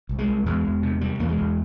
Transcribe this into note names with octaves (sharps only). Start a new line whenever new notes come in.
C2
G#3
C2
E2 G#3
E2
C3
C3 G3
E2 A#3
G#3
E2